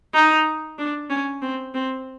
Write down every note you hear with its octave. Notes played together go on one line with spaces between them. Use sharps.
D#4
D4
C#4
C4
C4